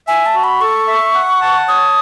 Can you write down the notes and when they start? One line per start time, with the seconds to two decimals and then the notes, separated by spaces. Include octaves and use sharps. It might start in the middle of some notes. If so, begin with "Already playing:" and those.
0.08 E5 G#5
0.26 A5
0.34 F#4
0.44 B5
0.61 A4 C#6
0.87 E5
1.14 F#5
1.41 A5
1.68 C#5 D#6